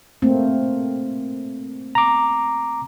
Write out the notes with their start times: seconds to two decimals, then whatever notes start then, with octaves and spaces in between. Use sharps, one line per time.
0.22 A3 A#3 C4
1.95 A#5 D6